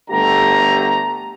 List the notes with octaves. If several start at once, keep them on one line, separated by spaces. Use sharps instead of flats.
G1 D3 A3 G4 A#5